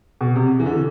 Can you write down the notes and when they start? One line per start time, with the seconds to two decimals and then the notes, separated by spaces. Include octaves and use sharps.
0.21 B2
0.36 C3
0.60 E3
0.66 D3